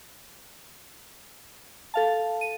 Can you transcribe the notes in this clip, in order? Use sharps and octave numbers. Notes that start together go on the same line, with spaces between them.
A4 F5 A5
D#7